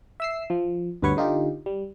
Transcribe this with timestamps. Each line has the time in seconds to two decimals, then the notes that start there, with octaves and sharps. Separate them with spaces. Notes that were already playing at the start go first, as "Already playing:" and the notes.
0.20 E5 E6 C7
0.50 F3
1.02 D2 G2 B3 B4 C#5 C#6
1.17 D3 D#4 F4 G4
1.66 G3